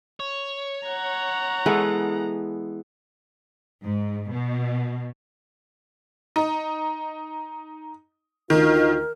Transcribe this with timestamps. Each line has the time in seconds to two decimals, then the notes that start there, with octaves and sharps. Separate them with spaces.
0.20 C#5
0.87 F#5 A#5
1.66 E3 G#3 B3 A4
3.84 G#2
4.31 B2
6.36 D#4
8.50 D2 D#3 D#4 F4 A#4